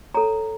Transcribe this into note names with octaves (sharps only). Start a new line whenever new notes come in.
A4 C#5 A#5